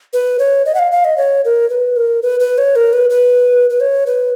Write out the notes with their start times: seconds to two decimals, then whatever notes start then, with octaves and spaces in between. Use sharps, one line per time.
0.13 B4
0.39 C#5
0.66 D#5
0.75 F#5
0.79 F5
0.92 F5
1.05 D#5
1.18 C#5
1.45 A#4
1.70 B4
1.96 A#4
2.23 B4
2.40 B4
2.58 C#5
2.76 A#4
2.93 B4
3.10 B4
3.70 B4
3.80 C#5
4.06 B4